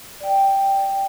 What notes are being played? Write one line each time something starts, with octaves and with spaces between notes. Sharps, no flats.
D5 G5